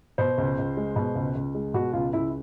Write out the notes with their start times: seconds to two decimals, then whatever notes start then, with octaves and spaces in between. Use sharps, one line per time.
0.18 B2 C5
0.38 C#2
0.58 C#2
0.77 G#3
0.96 B2
1.15 C#2
1.35 C#2
1.55 G#3
1.74 B2 F#4
1.93 C#2 F4
2.13 C#2 E4